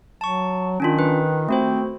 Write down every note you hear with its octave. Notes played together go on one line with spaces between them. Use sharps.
F#3 A5 C#6
D#3 C#4 D4 F4
B4
A3 C4 F#4 C5